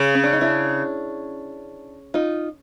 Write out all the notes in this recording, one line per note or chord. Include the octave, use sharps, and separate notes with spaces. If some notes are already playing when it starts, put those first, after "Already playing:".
Already playing: C#3
C#4
D4
D#4
D4 E4
D#4 F4